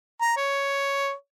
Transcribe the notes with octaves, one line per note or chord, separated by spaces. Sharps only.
A#5
C#5